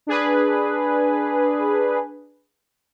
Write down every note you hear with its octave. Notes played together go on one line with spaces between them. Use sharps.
D4 G#4 B4